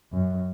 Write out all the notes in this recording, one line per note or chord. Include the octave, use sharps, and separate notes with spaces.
F#2